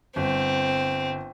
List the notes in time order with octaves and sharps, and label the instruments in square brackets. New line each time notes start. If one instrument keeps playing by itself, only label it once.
[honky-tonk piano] G1 [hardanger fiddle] C4